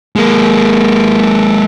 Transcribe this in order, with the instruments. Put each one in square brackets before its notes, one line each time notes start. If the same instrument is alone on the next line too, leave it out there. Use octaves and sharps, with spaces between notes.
[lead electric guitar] G#3 A#3